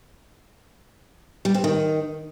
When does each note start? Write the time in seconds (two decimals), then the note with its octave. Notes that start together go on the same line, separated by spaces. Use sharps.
1.45 G3
1.54 C4
1.64 D#3